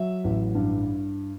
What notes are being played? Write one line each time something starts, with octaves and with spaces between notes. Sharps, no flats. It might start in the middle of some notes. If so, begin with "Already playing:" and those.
Already playing: F#3 E5
A1
G2